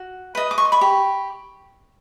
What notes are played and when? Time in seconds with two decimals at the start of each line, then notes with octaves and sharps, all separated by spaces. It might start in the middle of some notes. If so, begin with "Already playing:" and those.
Already playing: F#4
0.35 B4 D#5
0.51 D6
0.58 C#6
0.65 C6
0.72 B5 C#6
0.81 G4